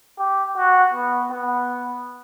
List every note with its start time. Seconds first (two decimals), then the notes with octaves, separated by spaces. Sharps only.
0.18 G4
0.56 F#4
0.94 B3
1.31 B3